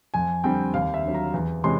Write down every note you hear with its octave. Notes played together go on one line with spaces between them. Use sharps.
F2 G#5
D3 G3 C4 G5
D#2 F5
E5
D3 F#3
A#5
E2
C3 E3 G#3 C#4 C6